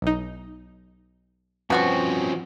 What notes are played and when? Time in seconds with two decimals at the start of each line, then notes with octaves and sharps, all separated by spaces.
0.02 B1 D#4
1.70 G2 B2 F3 C4 C#4 F#4 C#6